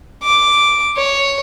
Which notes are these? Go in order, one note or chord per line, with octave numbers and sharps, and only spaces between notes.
D6
C#5